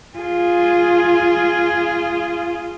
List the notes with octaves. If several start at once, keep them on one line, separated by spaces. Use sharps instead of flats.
F4 G#4